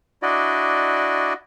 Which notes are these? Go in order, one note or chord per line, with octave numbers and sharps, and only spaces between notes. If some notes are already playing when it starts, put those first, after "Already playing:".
D4 E4 F#4 D5 D#5